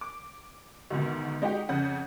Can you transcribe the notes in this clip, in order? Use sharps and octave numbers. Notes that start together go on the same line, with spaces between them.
D6
D2 G#2 B2 D#3
G#3 D#4 F#4 G4 G5
F2 C#3 F#5 G6